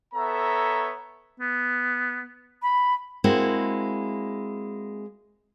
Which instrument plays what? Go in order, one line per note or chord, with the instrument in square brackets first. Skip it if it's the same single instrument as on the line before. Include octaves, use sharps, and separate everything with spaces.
[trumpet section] B3 A4 C#5 E5 A#5
[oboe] B3
[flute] B5
[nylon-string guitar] G#3 A#3 C4 E4 F#4